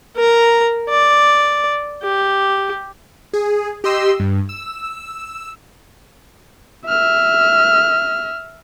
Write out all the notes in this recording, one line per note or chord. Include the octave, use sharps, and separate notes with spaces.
A#4 A#5
D5
G4
G#4
G4 D#5 C6 E6
G2
E6
E5 F6